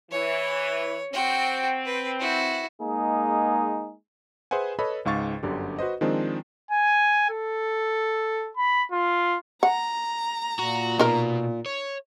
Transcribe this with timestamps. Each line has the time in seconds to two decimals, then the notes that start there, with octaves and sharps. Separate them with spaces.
0.11 E3 C#5
1.13 C4 F#4 G5
1.85 B4
2.20 E4 F#4
2.82 G#3 A#3 D#4 G#4
4.51 G#4 B4 C5 E5 F#5 G#5
4.79 A4 B4 C#5 D#5 B5
5.05 C#2 G#2 F5 C#6 A6
5.43 G1 F#2 D3 G4
5.79 F#4 B4 C5 D#5
6.01 D#3 F3 G#3 C4 D4 D#4
6.71 G#5
7.30 A4
8.57 B5
8.92 F4
9.63 F#5 A#5
10.59 A#2 F#4
10.99 B2 D#4 A#4
11.66 C#5